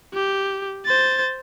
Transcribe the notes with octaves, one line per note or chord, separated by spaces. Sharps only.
G4
C5 A6